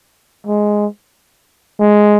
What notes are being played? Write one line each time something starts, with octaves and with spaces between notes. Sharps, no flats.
G#3
G#3